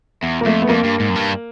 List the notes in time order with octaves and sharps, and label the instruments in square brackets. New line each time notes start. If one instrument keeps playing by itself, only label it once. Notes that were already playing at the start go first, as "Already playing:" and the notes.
[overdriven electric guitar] E2
[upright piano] A#3
[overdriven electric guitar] F2 [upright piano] A3
[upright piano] B3
[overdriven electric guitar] F2 [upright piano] A#3
[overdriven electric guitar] G2
G#2
F#2
G2